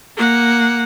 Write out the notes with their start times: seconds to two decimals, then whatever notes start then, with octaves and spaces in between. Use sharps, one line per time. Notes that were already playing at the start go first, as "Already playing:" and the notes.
0.17 A#3 F#5